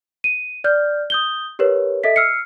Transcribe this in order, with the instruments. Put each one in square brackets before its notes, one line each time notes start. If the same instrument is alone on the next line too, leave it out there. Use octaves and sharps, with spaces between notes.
[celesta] D#7
D5 F6 G6
D#6 G6 G7
G4 A#4 B4 C#5
A4 D#5 E5 B6
E6 F6 C7 C#7